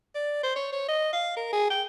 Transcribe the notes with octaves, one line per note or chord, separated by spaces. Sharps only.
D5
C5
C#5
C#5
D#5
F5
A#4
G#4
G5